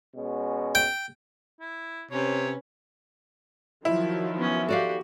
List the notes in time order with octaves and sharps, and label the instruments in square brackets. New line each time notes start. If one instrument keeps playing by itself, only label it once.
[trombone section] B2 G#3 C#4
[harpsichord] G5
[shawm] E4
[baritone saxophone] C3 [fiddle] C#4 B4 [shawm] C#5
[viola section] D#3 F3 F#3 [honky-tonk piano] E4
[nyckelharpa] B3 C#4
[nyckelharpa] F#4 G4 [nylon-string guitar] A4 D5 F5